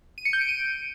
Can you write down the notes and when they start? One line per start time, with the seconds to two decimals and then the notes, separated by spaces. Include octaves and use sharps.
0.18 D#7
0.25 C#7
0.33 G6
0.41 D7
0.49 D#7